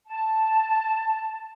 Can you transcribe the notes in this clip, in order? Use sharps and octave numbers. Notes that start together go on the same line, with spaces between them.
A5